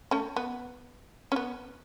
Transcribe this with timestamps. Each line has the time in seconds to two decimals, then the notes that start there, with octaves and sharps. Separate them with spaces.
0.11 A3 C#4
0.36 B3
1.32 C#4
1.36 B3